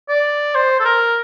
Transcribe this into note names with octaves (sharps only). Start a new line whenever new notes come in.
D5
C5
A4
A#4